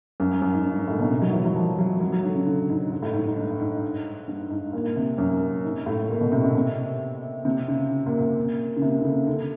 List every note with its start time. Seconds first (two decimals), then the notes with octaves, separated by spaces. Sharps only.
0.20 F#2
0.42 F#2
0.54 G#2
0.65 G2
0.76 G#2
0.88 A2
0.99 B2
1.10 C3
1.22 F#3
1.28 D#3
1.33 E3
1.45 F#3
1.56 F3
1.79 F#3
2.00 F#3
2.12 F#3
2.24 D3
2.35 C#3
2.47 D3
2.70 G#2
2.92 G#2
3.02 A2
3.13 G#2
3.25 G#2
3.37 G2
3.60 G#2
4.28 G2
4.50 G#2
4.73 A#2
4.96 C3
5.18 F#2
5.64 G#2
5.86 A2
6.10 A#2
6.21 B2
6.32 C3
6.43 C#3
6.55 C3
7.45 C3
7.68 C#3
7.91 C#3
8.07 A#2
8.21 A#2
8.76 C#3
8.82 C3
9.00 D3
9.04 C#3
9.27 D3